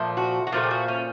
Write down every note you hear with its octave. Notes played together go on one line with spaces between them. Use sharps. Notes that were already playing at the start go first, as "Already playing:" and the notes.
Already playing: A#2 F3 A3
F#4
F#4
A#2 F3 A3 F4
G4
F#4
C#4